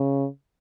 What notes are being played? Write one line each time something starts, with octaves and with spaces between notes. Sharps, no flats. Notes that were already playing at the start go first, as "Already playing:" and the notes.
Already playing: C#3